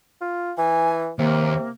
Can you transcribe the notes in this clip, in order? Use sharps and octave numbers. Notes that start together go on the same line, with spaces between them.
F4
E3 G#5
D#2 C3 A#3